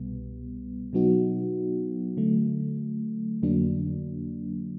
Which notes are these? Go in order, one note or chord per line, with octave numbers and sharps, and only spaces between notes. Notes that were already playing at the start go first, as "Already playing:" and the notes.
Already playing: C2 B2 G3 B3
B2 F#3 B3 D#4 F#4
D3 F#3 A3
F2 D3 F#3 A#3 D4